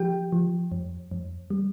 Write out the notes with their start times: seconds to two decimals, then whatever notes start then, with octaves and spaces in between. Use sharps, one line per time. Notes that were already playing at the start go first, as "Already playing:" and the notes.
Already playing: F3 G4 G5
0.32 F3
0.72 F2
1.11 F2
1.50 G3